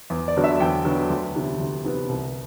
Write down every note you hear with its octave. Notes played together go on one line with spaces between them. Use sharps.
E2
D5
D3 F#3 B3
E5
E2 G5
D3 F#3 B3
D2
C3 E3 B3
D2
C3 E3 B3
C2